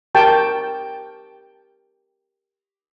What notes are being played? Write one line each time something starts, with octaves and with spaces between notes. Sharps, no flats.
G4 A#4 G5 A5 C#6